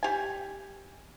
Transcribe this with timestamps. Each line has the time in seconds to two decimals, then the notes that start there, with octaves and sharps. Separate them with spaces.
0.03 G4 G#5